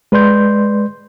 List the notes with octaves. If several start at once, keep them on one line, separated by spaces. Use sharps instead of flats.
G#3 B4 D5 C6 G6